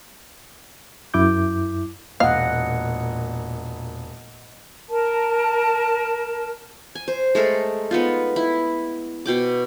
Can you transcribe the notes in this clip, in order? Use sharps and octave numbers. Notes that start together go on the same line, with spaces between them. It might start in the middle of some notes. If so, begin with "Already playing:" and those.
F#2 E4 D6 G6
E1 A#2 D#5 F5 F#5
A#4 A5
G#5
C5
G#3 A3 A4 A#4
B3 D#4 F4
E4
B2 G5 D6